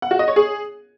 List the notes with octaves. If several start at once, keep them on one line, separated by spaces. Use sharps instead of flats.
F#5
F#4
D#5
C#5
G#4